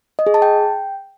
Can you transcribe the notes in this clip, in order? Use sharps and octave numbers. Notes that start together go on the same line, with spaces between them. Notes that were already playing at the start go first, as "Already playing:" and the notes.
D#5
G#4
A5
G5